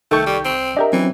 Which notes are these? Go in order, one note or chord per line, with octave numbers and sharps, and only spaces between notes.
C2 D#3 A3 A4 G5 C#6 G6
G3
C4
D4 G4 A#4 D#5 E5 G5
E3 F#3 C4 C#4